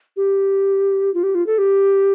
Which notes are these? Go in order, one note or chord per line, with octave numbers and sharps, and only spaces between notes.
G4
F4
G4
F4
A4
G4